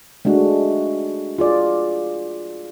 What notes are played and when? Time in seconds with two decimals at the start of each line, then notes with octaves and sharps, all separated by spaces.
0.25 G#3 A3 D4 F#4
1.39 F4 G#4 D5